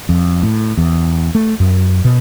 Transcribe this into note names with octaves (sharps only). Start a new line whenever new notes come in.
F2
A2
E2
A3
F#2
B2